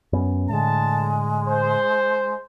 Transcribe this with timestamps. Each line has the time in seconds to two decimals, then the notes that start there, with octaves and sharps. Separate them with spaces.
0.13 F#2 B3 C#4
0.49 A2 D3 G#3 A5
1.46 C5